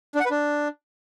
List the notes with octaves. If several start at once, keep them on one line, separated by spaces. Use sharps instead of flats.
D4
F#5
B4
D4